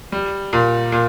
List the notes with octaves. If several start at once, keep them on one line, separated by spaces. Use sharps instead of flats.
G3
A#2
A#2